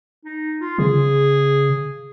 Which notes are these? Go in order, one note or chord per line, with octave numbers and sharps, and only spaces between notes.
D#4
F4
C#3 G#4